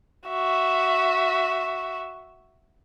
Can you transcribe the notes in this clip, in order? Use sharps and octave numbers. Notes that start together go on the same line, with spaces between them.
F#4 E5